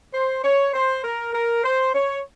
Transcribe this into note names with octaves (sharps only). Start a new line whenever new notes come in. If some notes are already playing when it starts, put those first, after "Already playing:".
C5
C#5
C5
A#4
A#4
C5
C#5